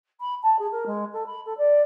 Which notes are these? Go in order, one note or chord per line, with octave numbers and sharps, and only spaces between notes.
B5
A5
G#4
A#4
G#3
A4
B5
A4
D5